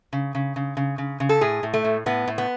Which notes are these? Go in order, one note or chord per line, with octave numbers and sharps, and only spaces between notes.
C#3
C#3
C#3
C#3
C#3
C#3
A4
A2 G#4
A2
A3
A2
A2 B3
A2
B3